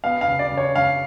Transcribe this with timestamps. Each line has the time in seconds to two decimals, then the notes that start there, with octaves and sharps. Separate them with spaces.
0.04 B3 F5
0.21 F5
0.28 C#3
0.39 D5
0.52 C#3
0.58 C#5
0.76 C#3 F5